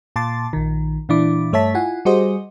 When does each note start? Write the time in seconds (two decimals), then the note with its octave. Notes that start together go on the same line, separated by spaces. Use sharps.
0.16 A#2 A5 C6 D6 A6
0.53 A#1 D#3
1.09 A#2 E3 D4 E4 D6
1.53 G2 A3 C#5 E5 A5 B6
1.74 E4 F4 F#5 G#5
2.05 G3 F#4 G#4 C5 D#5